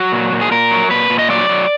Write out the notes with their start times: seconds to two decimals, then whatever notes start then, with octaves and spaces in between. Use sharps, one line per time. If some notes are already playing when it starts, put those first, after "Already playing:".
Already playing: F#3 F#4
0.12 A#2
0.33 A#2
0.41 G#4
0.51 A#2 A#4
0.71 F#3
0.91 A#2 B4
1.10 A#2
1.19 D#5
1.29 F#3 D5
1.49 F#3